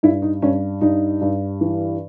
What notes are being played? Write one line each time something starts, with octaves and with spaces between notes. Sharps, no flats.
G2 E4
D#4
G2 C#4
G2 D#4
G2
E3